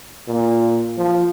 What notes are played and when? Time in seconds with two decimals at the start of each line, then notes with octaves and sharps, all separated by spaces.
0.28 A#2
0.98 F3